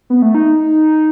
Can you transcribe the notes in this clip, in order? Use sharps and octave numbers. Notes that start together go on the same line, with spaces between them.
B3
A3
D#4